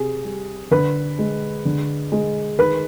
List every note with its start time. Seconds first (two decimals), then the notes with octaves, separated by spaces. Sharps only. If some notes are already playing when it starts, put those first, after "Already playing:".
Already playing: C3 G#4
0.25 G3
0.71 D3 B4
1.18 G#3
1.65 D3
2.12 G#3
2.59 D#3 B4